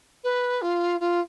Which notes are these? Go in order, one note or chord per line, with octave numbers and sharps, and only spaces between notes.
B4
F4
F4